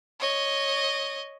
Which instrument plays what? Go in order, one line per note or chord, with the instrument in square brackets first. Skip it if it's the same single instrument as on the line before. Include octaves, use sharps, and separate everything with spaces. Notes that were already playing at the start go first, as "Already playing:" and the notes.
[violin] C#5 D#5